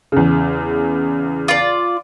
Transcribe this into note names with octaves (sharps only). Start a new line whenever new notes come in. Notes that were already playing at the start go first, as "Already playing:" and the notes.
E2 C#3
F4 D5